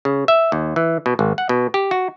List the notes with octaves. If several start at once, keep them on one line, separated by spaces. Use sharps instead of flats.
C#3
E5
D#2
E3
B2
G#1
F#5
B2
G4
F#4